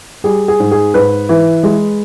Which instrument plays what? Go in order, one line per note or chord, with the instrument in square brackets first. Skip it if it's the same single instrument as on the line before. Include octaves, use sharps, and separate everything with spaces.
[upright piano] G3 G#4
G#4
G#2
G#4
G#2 B4
E3
G#3